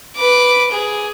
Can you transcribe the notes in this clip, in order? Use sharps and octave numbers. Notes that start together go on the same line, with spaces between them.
B4 D6
G#4